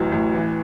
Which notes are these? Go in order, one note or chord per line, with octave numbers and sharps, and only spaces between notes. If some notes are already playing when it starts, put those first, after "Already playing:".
Already playing: A1 D2 F#3
A1
E3